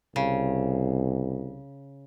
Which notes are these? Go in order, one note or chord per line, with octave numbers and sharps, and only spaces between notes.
C2 C#3